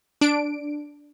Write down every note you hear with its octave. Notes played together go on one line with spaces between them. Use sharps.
D4 D7